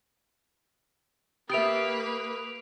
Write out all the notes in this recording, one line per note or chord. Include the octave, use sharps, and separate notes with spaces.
A#3 G4 B4 E5 D#6 D7 F7